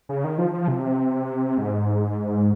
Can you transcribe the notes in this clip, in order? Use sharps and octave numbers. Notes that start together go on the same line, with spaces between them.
C#3
D#3
F3
F3
C3
G#2